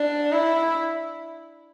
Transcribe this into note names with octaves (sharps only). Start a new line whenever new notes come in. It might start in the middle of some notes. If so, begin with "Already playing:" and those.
Already playing: D4
E4